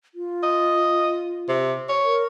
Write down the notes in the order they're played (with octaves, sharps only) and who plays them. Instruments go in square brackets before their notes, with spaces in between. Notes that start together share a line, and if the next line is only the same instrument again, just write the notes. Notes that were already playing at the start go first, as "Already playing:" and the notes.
[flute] F4
[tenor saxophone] D#5
C3
C#5
[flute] A#4